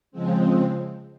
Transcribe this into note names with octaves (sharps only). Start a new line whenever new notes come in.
C#3 F3 G#3 C4